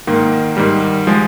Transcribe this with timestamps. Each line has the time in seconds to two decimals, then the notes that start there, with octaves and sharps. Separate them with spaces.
0.07 G#2 D#3 A#3
0.57 G#2 D#3 G3
1.07 F3 G#3